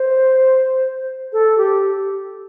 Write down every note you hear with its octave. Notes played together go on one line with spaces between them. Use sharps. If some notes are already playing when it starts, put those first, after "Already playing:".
Already playing: C5
A4
G4